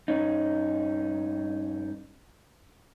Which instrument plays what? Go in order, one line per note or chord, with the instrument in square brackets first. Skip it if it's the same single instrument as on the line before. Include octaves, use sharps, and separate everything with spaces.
[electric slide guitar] G2 C#4 D#4